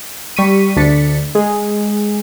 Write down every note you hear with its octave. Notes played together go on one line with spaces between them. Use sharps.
G3 C#6 B6 D#7
D2 D4 A6 B6 C#7
G#3 G#4